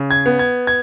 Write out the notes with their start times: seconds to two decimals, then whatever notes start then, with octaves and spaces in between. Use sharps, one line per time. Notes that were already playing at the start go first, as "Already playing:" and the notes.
Already playing: C#3
0.11 G#6
0.26 B3
0.39 G#6
0.67 G#6